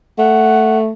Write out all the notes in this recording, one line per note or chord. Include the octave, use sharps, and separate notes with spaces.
A3 F#5